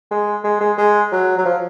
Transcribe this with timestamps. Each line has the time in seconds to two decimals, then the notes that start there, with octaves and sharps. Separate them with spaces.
0.11 G#3
0.44 G#3
0.61 G#3
0.78 G#3
1.12 F#3
1.38 F#3
1.45 F3